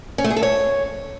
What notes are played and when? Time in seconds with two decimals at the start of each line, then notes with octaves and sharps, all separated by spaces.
0.18 C#4
0.24 A3
0.30 G#4
0.37 A4
0.43 C#5